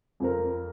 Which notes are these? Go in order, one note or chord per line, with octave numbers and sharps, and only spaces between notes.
F2 F3 C4 A#4